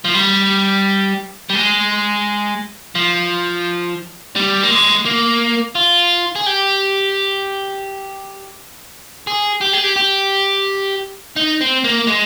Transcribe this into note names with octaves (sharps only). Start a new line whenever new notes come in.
F3
G3
G3
G#3
F3
G3
A#3
G#3
A#3
F4
G#4
G4
G#4
G4
G#4
G4
G4
D#4
C4
A#3
G#3